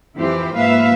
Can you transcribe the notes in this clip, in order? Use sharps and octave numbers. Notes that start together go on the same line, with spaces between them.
F2 E3 E4 G4 C5
G#2 F3 A#3 B4 E5 F5